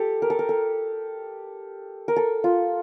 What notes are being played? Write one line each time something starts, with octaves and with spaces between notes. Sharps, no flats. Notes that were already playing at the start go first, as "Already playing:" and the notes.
Already playing: G4 A4
A#4
A4
A#4
A4
A#4
A4
F4